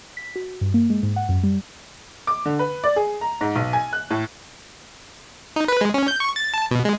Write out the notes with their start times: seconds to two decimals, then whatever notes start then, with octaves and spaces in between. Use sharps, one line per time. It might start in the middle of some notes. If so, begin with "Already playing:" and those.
0.17 B6
0.36 F#4
0.61 G2
0.74 A#3
0.90 G#3
1.03 G#2
1.16 F#5
1.29 F#2
1.43 G3
2.27 D6
2.45 D3
2.59 B4
2.84 D5
2.96 G#4
3.21 A#5
3.41 G#2
3.56 B1
3.73 G#5
3.93 F#6
4.10 A2
5.56 D#4
5.68 B4
5.81 G#3
5.94 C#4
6.08 G6
6.20 C#6
6.36 A6
6.54 A5
6.71 B2
6.85 G#3